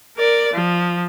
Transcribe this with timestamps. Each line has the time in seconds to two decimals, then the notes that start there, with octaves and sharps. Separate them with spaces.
0.17 A#4 D5
0.53 F3